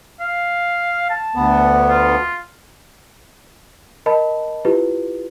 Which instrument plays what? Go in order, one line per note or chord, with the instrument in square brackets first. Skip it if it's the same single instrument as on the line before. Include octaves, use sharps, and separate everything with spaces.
[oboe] F5
A5
[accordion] D2 B3
[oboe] F4
[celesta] A#4 D#5 A5 B5
E4 F4 G4 B4